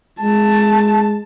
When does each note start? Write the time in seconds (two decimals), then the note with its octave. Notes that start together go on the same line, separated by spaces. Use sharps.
0.21 G#3 A5